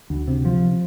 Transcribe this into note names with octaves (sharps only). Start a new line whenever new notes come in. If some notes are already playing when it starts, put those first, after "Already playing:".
D2
C3
F3